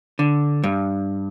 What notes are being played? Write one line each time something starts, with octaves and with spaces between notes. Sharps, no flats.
D3
G2